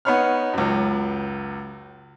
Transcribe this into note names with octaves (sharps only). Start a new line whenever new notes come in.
B3 D#4 C#5 B5 F6
C#2 F#2